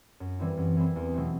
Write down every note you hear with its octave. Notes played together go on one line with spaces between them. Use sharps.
F#2
E3 G3 C4 E4
F#2
E3 G3 C4 E4
E2
B2 F#3 A3 C4